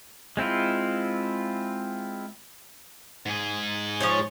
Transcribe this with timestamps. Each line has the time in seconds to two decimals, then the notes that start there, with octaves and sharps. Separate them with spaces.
0.37 G#3 C4 E4 F4
3.26 G#2 G#4
4.00 F3 C#5